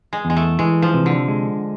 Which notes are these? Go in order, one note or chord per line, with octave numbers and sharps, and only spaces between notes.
G#3
E2
G#3
A3
E3 G#3
F3
C3
D3
G#3